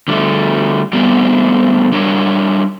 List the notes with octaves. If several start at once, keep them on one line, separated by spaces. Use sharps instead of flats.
D3 G3 A3
G3 A3 B3 C4 D4 G4
G3 D4 A#4 C#5